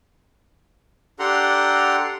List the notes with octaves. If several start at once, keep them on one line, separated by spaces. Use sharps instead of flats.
D4 G4 A4 F#5 A#5 C6